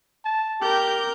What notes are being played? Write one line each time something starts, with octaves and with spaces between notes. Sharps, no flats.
A5
G4 A#4 G6